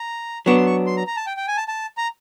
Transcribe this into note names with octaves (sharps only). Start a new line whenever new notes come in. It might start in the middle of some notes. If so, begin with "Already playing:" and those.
Already playing: A#5
F#3 B3 D4 C#6
C6
C#6
C6
A#5
A#5
A5
G5
G5
G#5
A5
A5
A#5